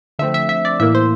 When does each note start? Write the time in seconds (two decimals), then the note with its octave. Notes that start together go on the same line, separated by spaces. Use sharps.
0.19 D3 F3 A3 C4 E5
0.34 E5
0.49 E5
0.65 D5
0.80 A2 E3 A#3 E5
0.95 C5